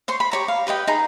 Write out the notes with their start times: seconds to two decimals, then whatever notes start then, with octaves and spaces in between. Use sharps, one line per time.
0.08 C5 C#5 C6
0.20 B5
0.31 G4 C#5 A#5
0.48 F5
0.67 G4 B4 D#5 G5
0.87 D#4 G#4 A#5 B5